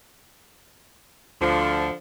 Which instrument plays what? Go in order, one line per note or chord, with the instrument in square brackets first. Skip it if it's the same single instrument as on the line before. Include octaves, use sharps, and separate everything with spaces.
[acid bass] D2 [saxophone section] D3 F3